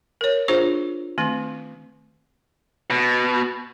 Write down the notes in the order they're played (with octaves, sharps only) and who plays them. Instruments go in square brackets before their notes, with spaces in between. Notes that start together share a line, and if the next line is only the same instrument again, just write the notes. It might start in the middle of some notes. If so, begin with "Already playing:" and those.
[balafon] A#4 C#5
D4 F4 G#4 C5
D#3 A3 C4
[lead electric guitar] B2